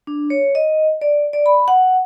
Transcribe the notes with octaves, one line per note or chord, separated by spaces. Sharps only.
D4
C#5
D#5
D5
D5
B5
F#5